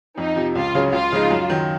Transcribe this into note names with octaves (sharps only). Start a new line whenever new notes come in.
F2 D#4
C3 F3
C#2 F4
C#3 F#3 C#4 G#4
C#2 F4
C#3 F3 G#3 D#4
F#2
D#3 F#3